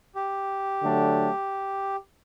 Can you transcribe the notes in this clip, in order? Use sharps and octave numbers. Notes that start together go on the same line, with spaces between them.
G4
D3 F#3 A3 D4